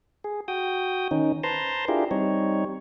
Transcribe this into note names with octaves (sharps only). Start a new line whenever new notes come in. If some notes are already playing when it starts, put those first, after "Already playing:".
G#4
F#4 G5 D#6
D#3 C#4 D#4
B4 C5 A5 A#5 C6
D4 E4 F4 G4 G#4 A#4
G3 C4 D#4 C#5